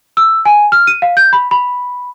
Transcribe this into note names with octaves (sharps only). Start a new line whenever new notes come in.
E6
G#5
F6
D#7
F5
G6
B5
B5